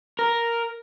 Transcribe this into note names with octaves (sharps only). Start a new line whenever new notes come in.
A#4